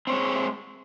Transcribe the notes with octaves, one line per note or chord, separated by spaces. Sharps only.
G#3 C4 C#5